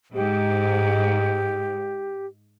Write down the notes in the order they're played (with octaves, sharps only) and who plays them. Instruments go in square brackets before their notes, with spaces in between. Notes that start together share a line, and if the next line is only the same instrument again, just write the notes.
[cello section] G#2 [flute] G4